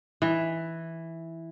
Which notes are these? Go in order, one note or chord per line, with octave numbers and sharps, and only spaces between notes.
E3